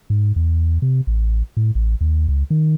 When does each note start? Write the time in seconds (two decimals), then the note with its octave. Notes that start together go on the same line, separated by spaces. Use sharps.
0.10 G#2
0.36 E2
0.82 C3
1.07 A1
1.57 A2
1.75 A1
2.01 D#2
2.28 C#2
2.50 D#3